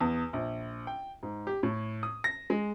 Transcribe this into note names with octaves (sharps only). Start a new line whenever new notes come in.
E2
A#1
G5
G#2
G4
A2
D#6
A#6
G#3